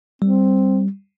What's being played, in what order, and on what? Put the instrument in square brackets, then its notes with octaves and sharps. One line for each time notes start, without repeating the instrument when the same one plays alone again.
[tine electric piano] G3 [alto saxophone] C4